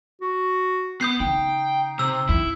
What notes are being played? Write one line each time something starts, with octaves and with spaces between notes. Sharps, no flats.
F#4
B3 D#6 G6 C7
C#3 D#4 G5
C3 E6
F2 E4